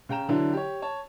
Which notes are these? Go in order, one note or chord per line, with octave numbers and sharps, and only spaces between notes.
C#3 G5 A#5 E7
D3 E3 F#3 D4 E4
G4 C#5
C#5 A5